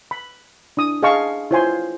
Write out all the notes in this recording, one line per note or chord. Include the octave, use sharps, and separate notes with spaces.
B5
D4 E4 D#6
G#4 D#5 F5 A5 C#6
E4 F4 C5 C#5 G#5 C6